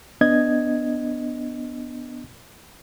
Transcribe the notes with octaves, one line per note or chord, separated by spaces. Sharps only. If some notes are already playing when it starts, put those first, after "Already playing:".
B3 D4 D#5 G#6